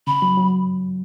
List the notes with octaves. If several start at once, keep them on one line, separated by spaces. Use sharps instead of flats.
C#3 B5
F#3
F#3